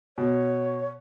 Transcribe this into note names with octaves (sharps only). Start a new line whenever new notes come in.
B2 C#5